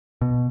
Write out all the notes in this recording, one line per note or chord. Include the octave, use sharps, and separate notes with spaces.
B2